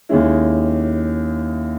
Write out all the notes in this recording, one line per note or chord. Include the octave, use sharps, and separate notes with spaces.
D#2 D#3 G#3 C#4 E4